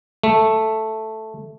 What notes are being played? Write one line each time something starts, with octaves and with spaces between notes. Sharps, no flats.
A3